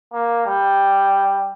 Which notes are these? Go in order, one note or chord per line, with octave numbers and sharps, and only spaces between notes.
A#3
G3